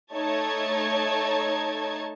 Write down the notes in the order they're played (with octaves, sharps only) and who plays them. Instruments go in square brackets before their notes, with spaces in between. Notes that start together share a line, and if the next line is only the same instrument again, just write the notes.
[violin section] A3 D#4 C#5 A5 G#6